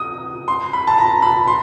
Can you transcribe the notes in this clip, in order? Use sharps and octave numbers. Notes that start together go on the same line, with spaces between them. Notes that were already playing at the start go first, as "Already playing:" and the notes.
Already playing: D#6
C6
B5
A5
A#5
B5
C6